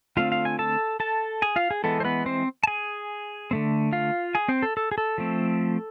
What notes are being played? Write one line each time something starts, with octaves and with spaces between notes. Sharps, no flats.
D3 A3 C4 F4 F5
F5
G#5
A4 A5
A4 A5
G#4 G#5
F4 F5
G#4
E3 G#3 B3 A4
C5
B3 B4
C4 C5
A5
G#4 G#5
D3 A3 C4
F4 F5
G#4 G#5
C4 C5
A4
A4
G#4
A4
F3 A3 C4